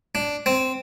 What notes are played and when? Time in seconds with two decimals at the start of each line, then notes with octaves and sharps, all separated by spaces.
0.15 D4
0.46 C4